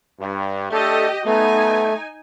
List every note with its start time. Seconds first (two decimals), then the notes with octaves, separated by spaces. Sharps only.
0.20 G2
0.70 A3 D4 G4 A4 D#5
1.26 A3 B3 D#4 G#5